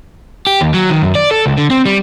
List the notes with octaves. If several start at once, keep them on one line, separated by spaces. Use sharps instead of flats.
G4
D#2
F#3
D#3
F#2
D5
A4
C#2
D3
C4
G3